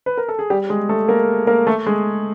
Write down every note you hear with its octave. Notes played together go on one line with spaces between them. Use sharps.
B4
A#4
A4
G#4
G3 G4
G#3 G#4
A3 A4
A#3 A#4
A#3 A#4
A3 A4
G#3 G#4